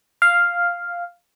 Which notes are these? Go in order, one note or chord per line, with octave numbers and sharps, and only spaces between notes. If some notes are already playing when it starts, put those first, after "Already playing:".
F5